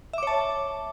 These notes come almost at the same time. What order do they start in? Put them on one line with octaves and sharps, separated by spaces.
E5 D6 C#5 A5